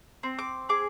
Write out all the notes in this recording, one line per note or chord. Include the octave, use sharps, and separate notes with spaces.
C4
D6
G#4 D6